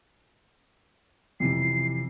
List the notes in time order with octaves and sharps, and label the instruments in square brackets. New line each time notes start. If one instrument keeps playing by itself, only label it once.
[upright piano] F2 C3 E3 [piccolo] C7